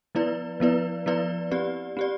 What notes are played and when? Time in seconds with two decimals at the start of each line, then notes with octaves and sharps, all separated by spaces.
0.15 F3 B3 E4 B4 D5
0.60 F3 B3 E4 B4 D5
1.06 F3 B3 E4 B4 D5
1.51 C4 G4 D5
1.97 C4 G4 D5